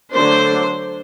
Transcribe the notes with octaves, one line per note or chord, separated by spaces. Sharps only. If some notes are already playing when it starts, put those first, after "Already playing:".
D3 F#3 A3 D4 C5